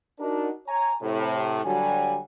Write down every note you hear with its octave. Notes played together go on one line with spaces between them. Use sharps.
D4 D#4 F#4 A#4
C#5 G#5 A#5
A2 C3
D3 F#3 G3 G#5